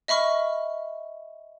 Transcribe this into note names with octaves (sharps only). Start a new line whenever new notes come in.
D#5 E5 B5 C#6 F6